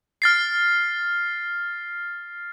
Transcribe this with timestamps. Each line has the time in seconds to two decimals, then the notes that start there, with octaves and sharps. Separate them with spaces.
0.22 F6 A6 C7